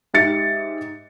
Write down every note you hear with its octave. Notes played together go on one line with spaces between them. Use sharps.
G#2 G4 E5 A6 C#7